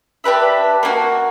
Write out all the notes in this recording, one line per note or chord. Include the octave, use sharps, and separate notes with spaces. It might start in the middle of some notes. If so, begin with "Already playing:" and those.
D4 G4 B4 E5
A#3 D4 F#4